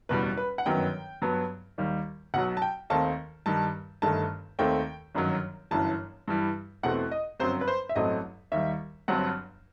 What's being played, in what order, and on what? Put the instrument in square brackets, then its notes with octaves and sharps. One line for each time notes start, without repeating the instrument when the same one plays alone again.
[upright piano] F#1 E2 B2 G3 B4
B4
F#5
G1 F#2 D#3 F#3 B3 G5
G2 F#3 B3
D#2 D#3 G3
B1 B2 F#3 F#5
A5
G5
D#2 D#3 A3 C4 A5
G2 D#3 G3 A5
G1 G2 D#3 A3 A5
D#2 D#3 A3 C4 G5
G1 F#2 D#3 F#3
G1 F#2 E3 A5
G2 E3 G3
E2 B2 A3 C4 F#5
D#5
G1 F#2 F#3 C4 C5
B4
C5
E5
A1 G2 F#3 A3 C4 D#5
D#2 D#3 G3 E5
G1 G2 F#3 C4 F#5